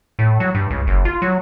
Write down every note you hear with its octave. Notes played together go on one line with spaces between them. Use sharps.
A2
F#3
G2
C#2
F#1
F4
F#3